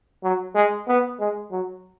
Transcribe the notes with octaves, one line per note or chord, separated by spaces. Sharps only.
F#3
G#3
B3
G#3
F#3